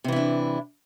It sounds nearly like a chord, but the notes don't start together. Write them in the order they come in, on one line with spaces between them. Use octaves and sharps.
C3 E3 E4 D4